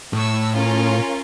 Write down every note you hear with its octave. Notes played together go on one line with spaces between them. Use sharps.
A2 C#6 E6
C#4 F4 A#4